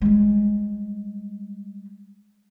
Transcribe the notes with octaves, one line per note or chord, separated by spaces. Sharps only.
G3 G#3